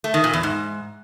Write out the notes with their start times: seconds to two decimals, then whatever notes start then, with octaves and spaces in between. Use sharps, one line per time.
0.04 A3
0.14 D#3
0.24 A#2
0.33 E2
0.43 G#2